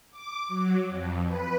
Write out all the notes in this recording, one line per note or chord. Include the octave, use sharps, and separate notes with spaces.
D6
F#3
F2
B4